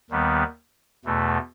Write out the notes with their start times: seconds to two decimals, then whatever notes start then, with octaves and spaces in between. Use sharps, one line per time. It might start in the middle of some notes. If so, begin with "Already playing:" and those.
0.10 D#2 D#3 G3 B3
1.05 E2 B2 A3